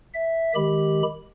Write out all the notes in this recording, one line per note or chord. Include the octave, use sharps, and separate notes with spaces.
E5
D#3 G#3 G4 B5